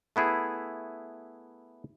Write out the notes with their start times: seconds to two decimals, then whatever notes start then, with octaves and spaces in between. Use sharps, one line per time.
0.16 A3 B3 E4 G#4